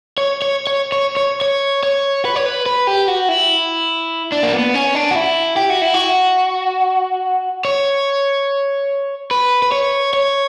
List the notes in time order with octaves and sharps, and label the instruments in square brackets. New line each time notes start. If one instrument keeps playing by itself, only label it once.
[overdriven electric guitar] C#5
C#5
C#5
C#5
C#5
C#5
C#5
B4
C#5
B4
B4
G4
F#4
E4
D4
A#3
B3
C#4
D4
F#4
E4
G4
F#4
E4
F#4
C#5
B4
B4
C#5
C#5